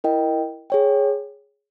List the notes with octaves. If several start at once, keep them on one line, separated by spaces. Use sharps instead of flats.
E4 A#4 D#5 G5
G#4 C#5 G5